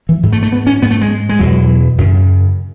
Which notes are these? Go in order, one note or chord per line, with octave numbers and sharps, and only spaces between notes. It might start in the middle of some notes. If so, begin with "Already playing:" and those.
E3
G#2
A3
A3
B3
C#4
G#2 B3
A3
G#3
G#3
E2 B2 F#3
F#2 C#3